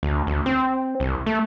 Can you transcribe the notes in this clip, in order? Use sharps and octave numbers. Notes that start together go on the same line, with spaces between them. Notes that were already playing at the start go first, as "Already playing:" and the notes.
D2
D2
C4
C2
A3